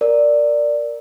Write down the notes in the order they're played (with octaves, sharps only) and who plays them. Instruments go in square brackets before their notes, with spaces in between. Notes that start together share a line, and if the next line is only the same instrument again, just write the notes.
[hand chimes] A#4 D5